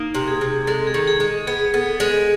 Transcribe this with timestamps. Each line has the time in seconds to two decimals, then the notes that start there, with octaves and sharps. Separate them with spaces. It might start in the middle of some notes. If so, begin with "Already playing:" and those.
Already playing: A#3 D#4
0.15 C3
0.28 G#4
0.41 C3
0.67 G#3 A4
0.87 G#4
0.94 D#3
1.07 G#4
1.20 G#3
1.47 B3 G#4
1.74 B3 A4
2.00 G#3 G#4